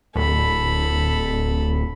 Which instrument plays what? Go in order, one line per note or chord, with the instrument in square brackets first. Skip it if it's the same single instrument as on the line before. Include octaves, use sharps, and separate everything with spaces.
[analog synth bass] D1 [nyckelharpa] A4 B5